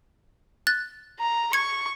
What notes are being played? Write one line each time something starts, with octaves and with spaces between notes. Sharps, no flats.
F#6 A6
A#5
C#6 G#6 C#7